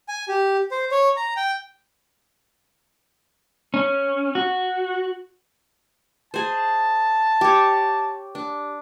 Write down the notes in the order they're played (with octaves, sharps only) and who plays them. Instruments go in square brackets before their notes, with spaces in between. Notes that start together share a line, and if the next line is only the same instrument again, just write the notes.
[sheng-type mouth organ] G#5
G4
C5
C#5
A#5
G5
[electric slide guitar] C#4
F#4
[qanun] G#4 C5 [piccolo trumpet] A5
[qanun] G4 C#5
D4